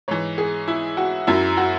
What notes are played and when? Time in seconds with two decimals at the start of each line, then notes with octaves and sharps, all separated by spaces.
0.08 G#2 E3 C#5
0.38 G#4
0.68 E4
0.97 F#4
1.27 F#2 F#3 E4
1.57 F#4